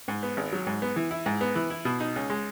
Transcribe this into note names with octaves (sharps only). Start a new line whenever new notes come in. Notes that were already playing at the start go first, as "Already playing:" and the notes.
G#2
B3
G#1
F#3
G#2
B3
E3
E4
G#2
B3
E3
E4
B2
D#4
C#2
G#3